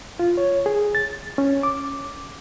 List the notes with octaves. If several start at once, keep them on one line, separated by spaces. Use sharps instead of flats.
F4
C#5
G#4
A6
C#4
D6